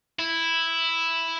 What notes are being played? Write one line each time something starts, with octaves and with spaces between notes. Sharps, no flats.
E4